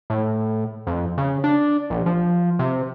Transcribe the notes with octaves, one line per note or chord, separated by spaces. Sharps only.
A2
F2
C#3
D4
A#1
F3
C3